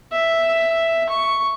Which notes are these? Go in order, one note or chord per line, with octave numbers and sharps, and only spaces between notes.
E5
C#6